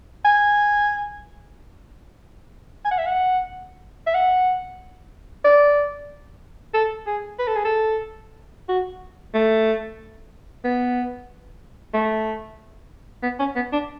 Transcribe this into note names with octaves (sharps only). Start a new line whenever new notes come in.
G#5
G#5
F#5
E5
F#5
E5
F#5
D5
A4
G#4
B4
A4
G#4
A4
F#4
A3
B3
A3
B3
C#4
B3
D4